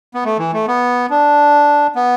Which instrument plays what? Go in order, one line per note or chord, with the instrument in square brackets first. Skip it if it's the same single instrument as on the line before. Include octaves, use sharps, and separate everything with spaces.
[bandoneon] B3
A3
E3
A3
B3
D4
B3